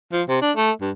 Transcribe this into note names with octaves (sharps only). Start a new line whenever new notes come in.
F3
C3
D4
A3
G2